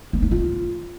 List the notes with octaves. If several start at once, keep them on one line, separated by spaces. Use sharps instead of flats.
B3
D#4
F4